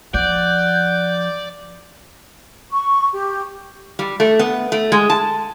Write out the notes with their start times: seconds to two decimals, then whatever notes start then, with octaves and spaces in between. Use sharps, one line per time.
0.14 F3 D5 F#5 G6
2.72 C#6
3.13 G4
3.99 G3
4.20 A3
4.39 B3
4.72 A3
4.92 G#3
5.10 A5